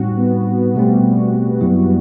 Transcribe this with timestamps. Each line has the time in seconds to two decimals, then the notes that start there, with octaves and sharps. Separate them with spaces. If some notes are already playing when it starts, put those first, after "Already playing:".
Already playing: A2 G3 C4 D#4 F#4
0.17 B3
0.45 B3
0.75 B2 G3 A3 C4
1.61 F#2 F#3 B3 E4